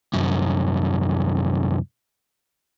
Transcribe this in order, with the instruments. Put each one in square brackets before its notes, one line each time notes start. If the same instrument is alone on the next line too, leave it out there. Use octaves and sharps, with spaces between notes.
[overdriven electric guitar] C2 F#2